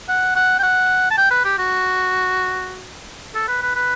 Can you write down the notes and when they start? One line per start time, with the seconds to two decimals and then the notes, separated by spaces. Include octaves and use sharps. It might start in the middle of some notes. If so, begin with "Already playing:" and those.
0.09 F#5
0.36 F#5
0.59 G5
0.63 F#5
1.11 A5
1.18 G5
1.31 B4
1.44 G4
1.59 F#4
3.35 A4
3.48 B4
3.62 B4
3.75 B4